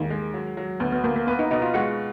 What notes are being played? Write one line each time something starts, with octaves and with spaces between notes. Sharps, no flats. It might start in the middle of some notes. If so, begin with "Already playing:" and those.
Already playing: D#2 D#3 G#3
G#3
F#3
F#3
D2 B3
B3
D2 A#3
A#3
B3 B4
D#4
B2 D#4
F4
G#3 F#4